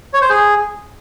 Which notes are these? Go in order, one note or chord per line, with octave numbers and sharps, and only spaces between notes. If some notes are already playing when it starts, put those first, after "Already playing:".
C#5
C5
G#4